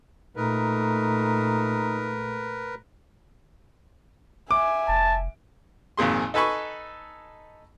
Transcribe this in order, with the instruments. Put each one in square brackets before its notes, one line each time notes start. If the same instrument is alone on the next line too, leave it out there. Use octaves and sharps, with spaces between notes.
[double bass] A#2 A3 [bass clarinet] D#4 [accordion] A#4 B4
[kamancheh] E5 G#5 [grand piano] D6
[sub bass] F1 [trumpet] A5
[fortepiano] G#1 F2 A#2 G#4 C6
D#4 A4 B4 G#5 B5 C#6